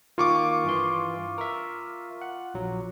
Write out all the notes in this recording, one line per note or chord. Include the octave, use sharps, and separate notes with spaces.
D#3 A#3 F4 C#6 D6
G2 E3 C6
A#4 E5
F#5
A#1 F#3